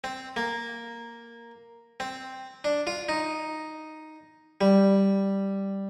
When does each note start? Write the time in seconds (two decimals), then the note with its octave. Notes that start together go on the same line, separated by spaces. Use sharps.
0.04 C4
0.36 A#3
2.00 C4
2.64 D4
2.87 F4
3.09 D#4
4.61 G3